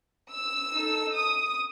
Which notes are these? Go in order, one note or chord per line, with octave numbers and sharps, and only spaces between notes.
E6
D#4 A4
D#6